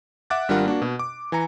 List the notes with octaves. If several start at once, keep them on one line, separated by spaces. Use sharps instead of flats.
E5 F#5 D6 F#6 A6
G#1 G3 D4 F4 A#4 F#5
A#3 D4 F#4
B2
D6
E3 G#5 A#5 C#7